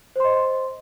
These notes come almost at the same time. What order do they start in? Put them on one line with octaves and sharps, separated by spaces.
C5 C6 D#5